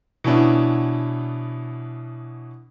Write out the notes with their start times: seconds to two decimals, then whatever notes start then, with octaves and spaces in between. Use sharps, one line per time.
0.24 B2 E3 B3 C#4 D4 E4